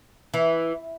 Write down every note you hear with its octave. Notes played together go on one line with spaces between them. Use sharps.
E3